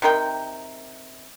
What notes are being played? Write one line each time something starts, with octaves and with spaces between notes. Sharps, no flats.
C3 D#4 A#4 G5